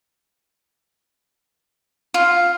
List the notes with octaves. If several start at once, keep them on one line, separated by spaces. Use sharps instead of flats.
F4